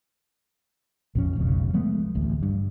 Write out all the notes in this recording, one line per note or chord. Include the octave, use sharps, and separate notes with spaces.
A#1 F2 C#4
F1 B1 C#3
F3 G#3 A3 B3
D1 A1 D2
G2